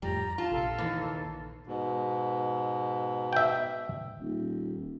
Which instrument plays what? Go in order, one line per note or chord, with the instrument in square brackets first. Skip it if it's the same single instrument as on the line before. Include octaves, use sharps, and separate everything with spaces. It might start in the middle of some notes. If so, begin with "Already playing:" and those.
[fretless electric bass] F2 A2 [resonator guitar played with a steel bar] G3 [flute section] A#5
[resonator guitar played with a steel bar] F4 [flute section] A5
[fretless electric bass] A#1 C3 [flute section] A4 F5
[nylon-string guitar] D#2 [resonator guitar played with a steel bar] E3
[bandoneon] G#2 B2
[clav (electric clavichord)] E5 G5
[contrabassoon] D#1